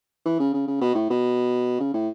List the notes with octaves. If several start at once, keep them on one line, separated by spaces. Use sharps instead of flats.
E3
C#3
C#3
C#3
B2
A2
B2
C#3
A2